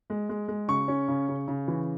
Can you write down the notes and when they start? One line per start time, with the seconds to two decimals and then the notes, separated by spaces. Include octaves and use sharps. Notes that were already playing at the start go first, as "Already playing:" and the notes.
0.10 G#3
0.29 G#3
0.48 G#3
0.68 C#3 C#6
0.88 C#4
1.08 C#3
1.28 C#3
1.48 C#3
1.68 E3